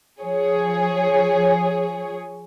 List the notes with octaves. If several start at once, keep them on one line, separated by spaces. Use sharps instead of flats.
F3 G#4 C#5